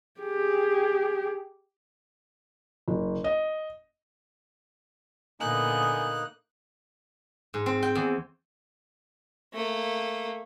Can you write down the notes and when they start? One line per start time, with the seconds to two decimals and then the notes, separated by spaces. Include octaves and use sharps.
0.20 G4 G#4
2.88 F#1
3.24 D#5
5.40 A#2 D3 A#3 B3 D#4 G#5 D#6 F#6
7.54 G#2
7.66 C4
7.83 G5
7.95 E2
9.53 A3 A#3